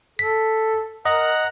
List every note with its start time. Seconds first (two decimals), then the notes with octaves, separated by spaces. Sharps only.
0.19 A4 B6
1.06 A#4 D#5 F#5 A#5 F#6